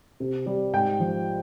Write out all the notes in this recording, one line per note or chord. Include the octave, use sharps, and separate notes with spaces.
C3
G3
G#2 G5
F3